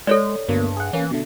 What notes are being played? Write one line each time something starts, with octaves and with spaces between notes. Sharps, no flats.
G#3 A4 C#5 D5
D2 G2 B2 A#3
G#4 F#5
E3 A#3 C#4
B2 D3 A3